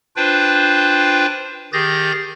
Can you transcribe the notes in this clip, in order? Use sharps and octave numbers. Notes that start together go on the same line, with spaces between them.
D4 F4 B4 C5 G5
D#3 G4 G#4 G6 A6 A#6